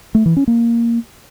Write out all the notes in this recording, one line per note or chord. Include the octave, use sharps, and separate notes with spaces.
A3
E3
C#4
A#3